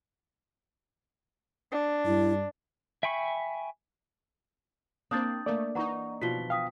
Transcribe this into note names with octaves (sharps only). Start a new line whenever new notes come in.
D4
G2 E4
E5 G5 G#5 B5 C#6
A#3 C4 D4 D#6 G6 A6
A3 A#3 D5
E3 D#4 F#5 A#5 C#6
B2 F3 B6 G7
F5 G5 D#6 B6